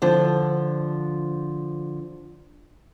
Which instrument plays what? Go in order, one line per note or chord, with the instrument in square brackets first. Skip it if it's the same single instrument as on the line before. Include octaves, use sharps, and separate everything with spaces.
[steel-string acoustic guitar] D3 F3